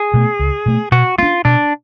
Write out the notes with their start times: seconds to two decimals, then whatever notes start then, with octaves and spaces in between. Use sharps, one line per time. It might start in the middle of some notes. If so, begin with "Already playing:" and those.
Already playing: G#4
0.14 B2 A3
0.39 C#2
0.66 B2 A3
0.92 B2 F#4
1.18 A3 D4 F4
1.45 B2 D4